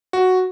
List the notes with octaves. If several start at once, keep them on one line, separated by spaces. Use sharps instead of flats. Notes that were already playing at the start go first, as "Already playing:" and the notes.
F#4